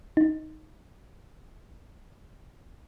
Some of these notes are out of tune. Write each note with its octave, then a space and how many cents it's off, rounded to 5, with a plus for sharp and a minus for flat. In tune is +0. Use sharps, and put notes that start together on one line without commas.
D#4 +5